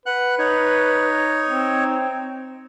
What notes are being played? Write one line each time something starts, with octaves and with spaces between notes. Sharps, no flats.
B4 F#5 F#6
D#4 C#5
C4